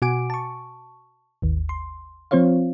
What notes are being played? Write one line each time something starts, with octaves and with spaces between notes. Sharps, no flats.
B2 F#4 F#5 G#5 D6 D7
A5 C#6
G#1 D#2
C6
F3 C4 F4 C5 C#5 F5